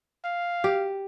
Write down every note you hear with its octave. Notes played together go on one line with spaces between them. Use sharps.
F5
G4